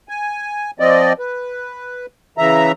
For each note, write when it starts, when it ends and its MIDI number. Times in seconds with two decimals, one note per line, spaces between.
0.09 0.71 80
0.80 1.13 53
0.80 1.13 60
0.80 1.13 74
0.80 1.13 75
1.19 2.06 71
2.38 2.72 49
2.38 2.72 52
2.38 2.72 76
2.38 2.72 82